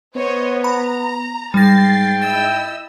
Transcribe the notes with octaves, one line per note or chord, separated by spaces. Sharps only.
B3 C5 C#5 D#5
A#5 B5
G#2 G3 G5 A6 A#6 C7
E4 D#5 E6 A6